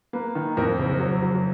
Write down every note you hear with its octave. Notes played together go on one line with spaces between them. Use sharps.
A#3 B4
D#3
F2 A#4
F#1
F#3
F#3